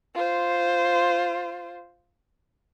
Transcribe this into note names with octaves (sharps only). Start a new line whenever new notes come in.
F4 C5